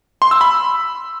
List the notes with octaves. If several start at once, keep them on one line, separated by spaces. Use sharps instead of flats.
C6
E6
B5